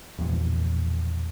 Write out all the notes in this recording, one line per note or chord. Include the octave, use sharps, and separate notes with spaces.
E1 A#1